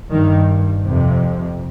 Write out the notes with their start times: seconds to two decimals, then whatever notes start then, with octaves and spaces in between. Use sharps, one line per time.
0.11 G2 D#3
0.84 F2 C3